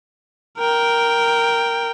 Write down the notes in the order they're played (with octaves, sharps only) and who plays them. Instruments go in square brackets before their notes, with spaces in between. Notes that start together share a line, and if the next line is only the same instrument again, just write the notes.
[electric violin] A#4 G5